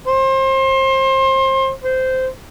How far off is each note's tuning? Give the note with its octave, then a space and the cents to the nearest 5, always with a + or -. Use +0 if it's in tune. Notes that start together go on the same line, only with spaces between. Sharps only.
C5 +30
C5 -15